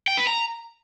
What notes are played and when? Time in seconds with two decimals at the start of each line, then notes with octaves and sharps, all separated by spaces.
0.08 G5
0.17 B4
0.27 A#5